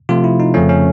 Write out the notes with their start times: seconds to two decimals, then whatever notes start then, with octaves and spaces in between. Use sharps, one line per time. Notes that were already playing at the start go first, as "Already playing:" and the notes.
0.09 C3 F3 A3 F4
0.24 E4
0.40 D#4
0.54 F2 C#3 F3 A3 C#4
0.69 C#4